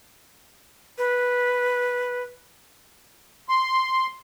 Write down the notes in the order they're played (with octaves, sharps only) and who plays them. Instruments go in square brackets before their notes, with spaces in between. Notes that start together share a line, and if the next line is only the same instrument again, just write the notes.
[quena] B4
[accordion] C6